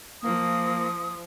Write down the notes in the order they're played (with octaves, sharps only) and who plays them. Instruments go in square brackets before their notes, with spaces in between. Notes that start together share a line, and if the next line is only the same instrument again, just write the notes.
[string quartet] F3 [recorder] A#3 [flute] D#6